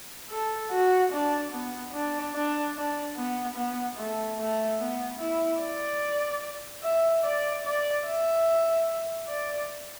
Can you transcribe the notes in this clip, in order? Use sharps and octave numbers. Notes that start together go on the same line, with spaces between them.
A4
F#4
D4
B3
D4
D4
D4
B3
B3
A3
A3
B3
E4
D5
E5
D5
D5
E5
D5